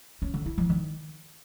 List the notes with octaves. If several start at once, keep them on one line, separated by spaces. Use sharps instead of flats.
C#4
D3
E4
F3
D#3